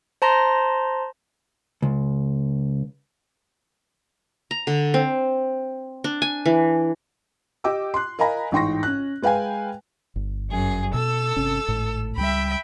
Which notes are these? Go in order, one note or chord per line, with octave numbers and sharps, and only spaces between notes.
C5 A5 A#5 C6 A#6
C#2
A#5
D3
C4
D4
G#5
E3
G4 D#5 G5 D6 E6
C6 F#6
A#4 D#5 F5 G#5 A#5 B5
A1 G#2 G5 C6 C#6 A#6
C#4 F#6
G#3 B4 F5 G5 G#5
G1
F#2 G#4
B2 A4 E6
G1 C3 C#4
G#1 A2
C#2 D#3 G3 E5 G5 B5